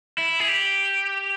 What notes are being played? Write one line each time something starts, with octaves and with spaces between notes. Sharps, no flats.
E4
G#4
G4